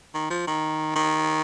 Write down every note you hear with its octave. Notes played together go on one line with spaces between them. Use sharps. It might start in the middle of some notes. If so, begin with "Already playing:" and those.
D#3
F3
D#3
D#3